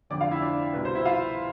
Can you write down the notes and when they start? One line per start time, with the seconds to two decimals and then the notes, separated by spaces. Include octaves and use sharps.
0.10 F1 F2 D3 D5 D6
0.21 F4 F5
0.31 E4 E5
0.41 D4 D5
0.73 C2 B2 B4
0.85 C5
0.95 E4 E5
1.05 F4 F5